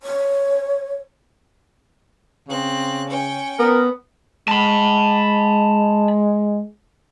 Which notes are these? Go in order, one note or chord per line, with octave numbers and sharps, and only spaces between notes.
C#5
C#3 C4 F#6
C#4 G5
B3 A#4
G#3 A5 B5